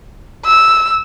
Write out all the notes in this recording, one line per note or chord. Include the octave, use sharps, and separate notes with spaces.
E6